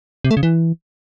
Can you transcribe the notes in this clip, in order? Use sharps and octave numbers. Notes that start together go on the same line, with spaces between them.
C3
A3
C#3
E3